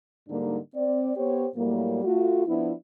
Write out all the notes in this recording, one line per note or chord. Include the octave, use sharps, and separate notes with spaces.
G#2 D3 G3 A#3 D4 D#4
C4 D5
B3 G4 C5 C#5
A2 F#3 G3 A#3
A3 F4 F#4
F3 B3 D4 E4